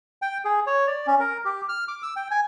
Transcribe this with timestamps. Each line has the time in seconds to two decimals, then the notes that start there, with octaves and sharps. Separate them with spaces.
0.22 G5
0.45 G#4
0.67 C#5
0.87 D5
1.07 C#4
1.20 A#4
1.45 G4
1.69 F6
1.88 D6
2.03 E6
2.16 G5
2.31 G#5